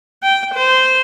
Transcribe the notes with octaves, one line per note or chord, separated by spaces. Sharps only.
G5
C5